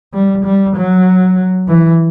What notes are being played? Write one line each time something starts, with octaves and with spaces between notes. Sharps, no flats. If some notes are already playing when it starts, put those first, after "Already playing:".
G3
G3
F#3
E3